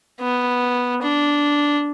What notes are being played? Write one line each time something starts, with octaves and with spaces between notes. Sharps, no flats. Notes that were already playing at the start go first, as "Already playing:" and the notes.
B3
D4